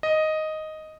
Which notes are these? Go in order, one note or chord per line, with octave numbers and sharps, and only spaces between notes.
D#5